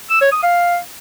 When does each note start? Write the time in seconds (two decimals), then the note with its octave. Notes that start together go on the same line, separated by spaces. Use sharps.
0.10 E6
0.21 C#5
0.32 D#6
0.43 F5